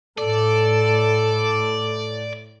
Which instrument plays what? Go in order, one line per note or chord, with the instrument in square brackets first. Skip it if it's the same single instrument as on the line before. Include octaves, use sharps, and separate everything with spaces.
[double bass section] A2 [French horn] A4 [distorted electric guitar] D5